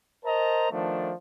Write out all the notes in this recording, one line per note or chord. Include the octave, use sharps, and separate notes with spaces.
A#4 C5 D#5 A5 A#5
D#3 F3 A3 B3 D4